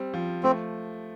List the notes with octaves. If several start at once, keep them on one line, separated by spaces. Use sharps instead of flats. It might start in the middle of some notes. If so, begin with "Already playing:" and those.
Already playing: G3 C4
F3
A3 C4